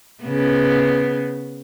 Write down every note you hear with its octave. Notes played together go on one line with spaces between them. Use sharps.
C#3 B3